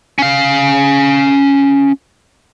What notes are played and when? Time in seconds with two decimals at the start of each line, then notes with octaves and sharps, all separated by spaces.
0.19 C#4 F5